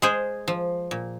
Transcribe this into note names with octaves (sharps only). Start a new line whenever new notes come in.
G#3 G#4 C5
F3
A#2